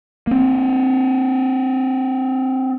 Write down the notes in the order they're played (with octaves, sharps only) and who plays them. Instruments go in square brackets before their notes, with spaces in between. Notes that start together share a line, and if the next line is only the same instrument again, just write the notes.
[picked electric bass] A#3 C4